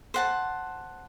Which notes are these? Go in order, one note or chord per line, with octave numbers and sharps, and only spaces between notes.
C5 F#5 A5